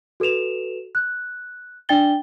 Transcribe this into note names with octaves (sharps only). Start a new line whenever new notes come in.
F#4 A4 B4 E7 F7
F#6
D4 D5 G5 A6 G7